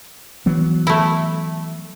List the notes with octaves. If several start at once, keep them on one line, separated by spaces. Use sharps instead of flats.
E3 F#3 B3
A3 E4